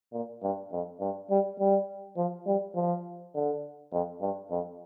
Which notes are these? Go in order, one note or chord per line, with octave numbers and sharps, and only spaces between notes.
A#2
G2
F2
G2
G3
G3
F3
G3
F3
D3
F2
G2
F2